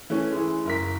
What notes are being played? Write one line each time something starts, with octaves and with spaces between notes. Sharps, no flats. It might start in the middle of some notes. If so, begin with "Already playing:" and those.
E3 A3 C#4
G#3 E4
F#1 A#4 B6